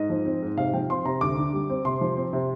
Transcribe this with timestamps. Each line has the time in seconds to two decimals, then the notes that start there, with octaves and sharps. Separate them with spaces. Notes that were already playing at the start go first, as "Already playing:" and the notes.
Already playing: G#2 D#5
0.10 F3
0.26 C4
0.42 G#2
0.57 C3 F5
0.73 F3 G5
0.90 C4 C6
1.05 C3 A#5
1.21 D2 D6
1.37 D3
1.53 G3
1.70 C4
1.85 C3 C6
2.01 F3
2.17 C4
2.33 C3